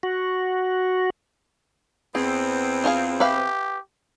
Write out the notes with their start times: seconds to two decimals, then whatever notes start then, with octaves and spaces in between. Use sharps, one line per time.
0.03 F#4
2.15 E2 B3 C4 G#4
2.84 F4 G#4 F5
3.20 G4 B4 E5 F5